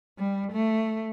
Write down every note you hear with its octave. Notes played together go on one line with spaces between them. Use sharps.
G3
A3